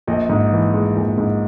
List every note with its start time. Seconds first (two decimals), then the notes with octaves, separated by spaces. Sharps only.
0.07 A#1 D#5
0.29 G#2
0.52 E3
0.74 G#3
0.96 A#1
1.18 G#2